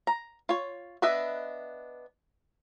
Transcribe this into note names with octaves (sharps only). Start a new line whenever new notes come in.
A#5
F4 C#5
B3 D4 B4 D#5 E5